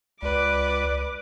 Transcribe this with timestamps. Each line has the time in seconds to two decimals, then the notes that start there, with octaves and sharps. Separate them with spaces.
0.22 C#2 B4 D5 D6